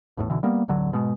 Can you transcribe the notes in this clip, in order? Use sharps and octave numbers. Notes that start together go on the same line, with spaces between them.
G#1 E2 A2
B1 B2 D3 E3
G3 A#3 B3
D1 A1 D3 F#3
G#2 B2 G#3